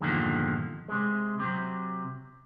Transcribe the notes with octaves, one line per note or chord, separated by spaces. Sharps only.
E2 G2 A#2 D3 D#3 F3
C3 G#3
C3 F#3